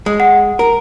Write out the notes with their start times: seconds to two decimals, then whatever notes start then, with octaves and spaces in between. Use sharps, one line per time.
0.06 G#3
0.20 F#5
0.59 A#4